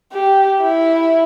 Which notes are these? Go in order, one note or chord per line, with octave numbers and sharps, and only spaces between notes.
G4
E4